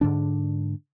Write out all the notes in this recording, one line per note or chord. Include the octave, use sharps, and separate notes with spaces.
G#2 D3 D4